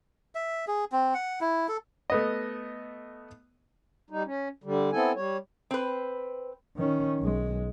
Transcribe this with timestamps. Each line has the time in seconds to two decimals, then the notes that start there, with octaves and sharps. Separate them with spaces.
0.35 E5
0.68 G#4
0.92 C4
1.14 F#5
1.41 E4
1.68 A4
2.10 A3 B3 D#5
4.10 G3 D#4
4.25 C#4
4.64 D3 G3
4.92 B3 C4 E4 A4 G#5
5.15 G3 C#5
5.71 C4 B4
6.76 D#3 C#4
7.20 B1 G#3